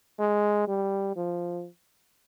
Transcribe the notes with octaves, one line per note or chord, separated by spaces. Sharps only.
G#3
G3
F3